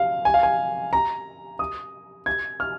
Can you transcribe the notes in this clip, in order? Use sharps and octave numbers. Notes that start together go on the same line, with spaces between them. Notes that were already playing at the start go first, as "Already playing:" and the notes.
Already playing: F5
G#5
F5
G#5
A#5
D#6
G#6
F6